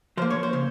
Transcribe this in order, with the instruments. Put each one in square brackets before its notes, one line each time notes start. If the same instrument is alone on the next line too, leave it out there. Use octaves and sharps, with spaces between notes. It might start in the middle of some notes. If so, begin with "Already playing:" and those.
[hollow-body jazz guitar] F3 A#3 C5
C#5
C5
C#3